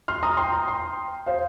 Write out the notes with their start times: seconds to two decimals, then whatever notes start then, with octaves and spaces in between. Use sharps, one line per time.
0.08 C6 F6
0.23 A#5 D#6
0.37 G5 C6
0.52 A#5 D#6
0.68 G5 C6
1.26 C5 F5